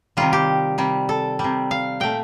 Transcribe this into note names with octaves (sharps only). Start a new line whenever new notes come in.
C3 D#3 G3 F4
G4
C3 G3
A4
C3 G3
F5
A#2 A3 G5